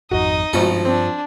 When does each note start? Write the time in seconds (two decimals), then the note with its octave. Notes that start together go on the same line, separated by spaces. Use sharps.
0.11 G#1 F2 D#4 F#4 D#5
0.53 G#1 G2 B2 F3 A4
0.85 C4 D4